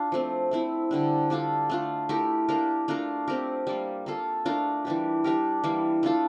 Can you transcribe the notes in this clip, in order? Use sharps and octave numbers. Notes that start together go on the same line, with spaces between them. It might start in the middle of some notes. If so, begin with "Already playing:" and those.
Already playing: D4 F4
F3 A3 C4
A3 C4 E4
D3 G3 D4
G3 D4 F4 A4
A3 D4 F4
A3 E4 G4 A#4
A#3 D4 G4 A#4
A3 D4 F4 A#4
A3 C4 G4 A#4
G3 A#3 F4
A#3 F4 A4
A3 D4 F4 A#4
E3 G3 D4 G4
G3 D4 G4 A#4
E3 G3 A#3
A3 D4 F4 A4